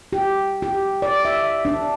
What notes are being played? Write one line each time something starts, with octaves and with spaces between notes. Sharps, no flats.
G4
G4
D5
E5
D4